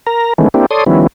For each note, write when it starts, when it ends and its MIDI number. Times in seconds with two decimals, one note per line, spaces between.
0.07 0.33 70
0.07 0.33 82
0.38 0.48 51
0.38 0.48 52
0.38 0.48 56
0.38 0.48 57
0.38 0.48 59
0.38 0.48 61
0.54 0.66 58
0.54 0.66 60
0.54 0.66 62
0.54 0.66 64
0.54 0.66 67
0.71 0.84 69
0.71 0.84 73
0.71 0.84 74
0.71 0.84 84
0.71 0.84 87
0.86 1.07 51
0.86 1.07 53
0.86 1.07 55
0.86 1.07 59
0.86 1.07 61
0.86 1.07 64